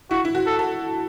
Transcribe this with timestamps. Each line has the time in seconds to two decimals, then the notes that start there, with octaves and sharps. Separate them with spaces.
0.11 E4 F#4
0.25 E4
0.35 F#4
0.46 A4
0.59 A4